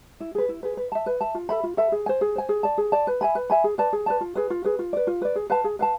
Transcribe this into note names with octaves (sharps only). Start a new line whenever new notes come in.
E4
G#4 B4
E4
G#4 B4
B4
E5 A5
B4
E5 A5
F4
A4 E5 B5
F4
A4 E5 B5
G#4
C5 G#5
G#4
C5 G#5
G#4
D5 A5
G#4
D5 A5
B4
E5 G#5 B5
B4
E5 G#5 B5
G#4
B4 D5 A5
G#4
B4 D5 A5
F4
G#4 B4
F4
G#4 B4
F4
B4 D5
F4
B4 D5
G#4
B4 F5 A5
G#4
B4 F5 A5